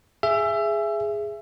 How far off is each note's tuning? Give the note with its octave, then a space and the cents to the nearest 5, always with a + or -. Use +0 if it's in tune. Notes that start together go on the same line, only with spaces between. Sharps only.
G#4 +0 E5 +20